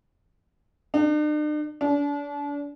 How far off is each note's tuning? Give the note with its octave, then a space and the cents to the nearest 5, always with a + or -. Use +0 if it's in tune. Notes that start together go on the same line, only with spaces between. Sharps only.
D4 +45
D4 -35